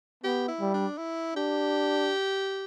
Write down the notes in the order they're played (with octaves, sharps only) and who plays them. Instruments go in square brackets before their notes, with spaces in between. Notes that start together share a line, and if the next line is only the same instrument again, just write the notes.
[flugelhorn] B3 [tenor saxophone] G4
[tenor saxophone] E4
[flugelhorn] G3
[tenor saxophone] D4
E4
[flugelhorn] D4 [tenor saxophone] G4